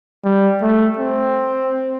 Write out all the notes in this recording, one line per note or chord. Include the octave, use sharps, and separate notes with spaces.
G3
A3
C4